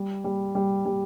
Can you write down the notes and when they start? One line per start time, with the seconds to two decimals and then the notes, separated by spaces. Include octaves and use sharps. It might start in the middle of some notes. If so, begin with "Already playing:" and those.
Already playing: G3
0.24 G3
0.55 G3
0.85 G3